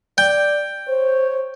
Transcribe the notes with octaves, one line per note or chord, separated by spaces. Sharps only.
D5 G5
C5 C#5